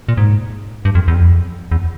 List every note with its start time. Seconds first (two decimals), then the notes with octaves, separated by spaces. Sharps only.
0.09 A#2
0.17 G#2
0.85 G2
0.95 F2
1.08 E2
1.14 F2
1.72 E2